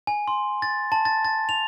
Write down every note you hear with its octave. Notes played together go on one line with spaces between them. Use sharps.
G#5
C6
A6
A5
A6
A6
F7